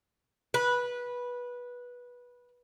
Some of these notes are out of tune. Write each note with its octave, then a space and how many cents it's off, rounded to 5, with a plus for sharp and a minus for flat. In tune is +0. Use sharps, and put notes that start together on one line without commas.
B4 -15